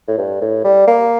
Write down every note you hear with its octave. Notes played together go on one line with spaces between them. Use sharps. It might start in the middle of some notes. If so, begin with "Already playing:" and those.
A2
G2
A2
G3
A#3